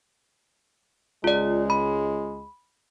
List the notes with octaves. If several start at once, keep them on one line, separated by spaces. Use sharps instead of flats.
C#2 G#3 F4 D5
B5